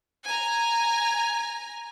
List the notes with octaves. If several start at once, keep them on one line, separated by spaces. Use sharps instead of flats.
G#5 A#5